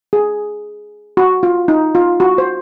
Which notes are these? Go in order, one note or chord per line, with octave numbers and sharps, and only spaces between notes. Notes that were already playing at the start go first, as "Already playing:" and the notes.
G#4
F#4
F4
D#4
F4
F#4
C5